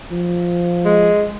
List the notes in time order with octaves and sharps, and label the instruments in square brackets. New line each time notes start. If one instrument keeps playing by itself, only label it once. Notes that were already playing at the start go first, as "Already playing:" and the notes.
[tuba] F3
[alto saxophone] G#3